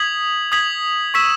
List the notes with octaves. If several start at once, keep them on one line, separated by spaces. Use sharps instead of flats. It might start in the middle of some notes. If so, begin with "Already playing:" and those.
Already playing: D#6 G#6 B6 F#7
D#6 G#6 B6 F#7
C#6 E6 B6 E7